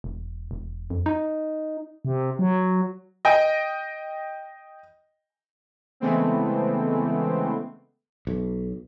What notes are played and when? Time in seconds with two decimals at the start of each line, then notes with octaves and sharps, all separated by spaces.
0.04 E1
0.51 E1
0.90 F2
1.06 D#4
2.05 C3
2.39 F#3
3.25 D#5 G5
6.00 C#3 E3 G#3 A3 B3 C4
8.27 B1